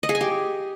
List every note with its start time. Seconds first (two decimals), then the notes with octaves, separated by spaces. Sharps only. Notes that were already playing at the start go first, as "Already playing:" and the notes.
0.03 D#5
0.09 G#4
0.15 G#5
0.21 G4